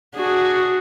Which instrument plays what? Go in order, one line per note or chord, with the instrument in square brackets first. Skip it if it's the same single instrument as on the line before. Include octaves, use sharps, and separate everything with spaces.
[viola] D4 G#4 [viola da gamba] F#4